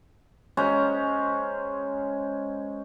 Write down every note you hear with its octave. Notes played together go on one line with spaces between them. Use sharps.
G#3 C#4 C5 A#5